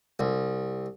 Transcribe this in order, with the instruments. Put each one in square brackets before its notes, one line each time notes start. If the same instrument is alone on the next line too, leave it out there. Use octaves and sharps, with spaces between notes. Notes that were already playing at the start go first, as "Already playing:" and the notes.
[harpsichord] C2